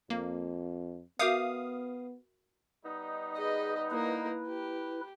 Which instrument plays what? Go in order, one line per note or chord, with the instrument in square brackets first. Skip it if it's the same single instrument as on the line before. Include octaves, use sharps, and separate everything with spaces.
[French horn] F2 [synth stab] A#3
[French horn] B3 [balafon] F#4 A#4 E5 [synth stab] F5 D#6
[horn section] G3 B3 D#4
[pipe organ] G#4 [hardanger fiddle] B4 D#5
[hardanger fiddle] A#3 A#4 [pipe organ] E4 B4
[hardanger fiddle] G4